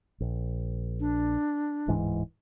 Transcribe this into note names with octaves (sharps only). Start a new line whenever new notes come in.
A#1
D4
D1 G#2 E3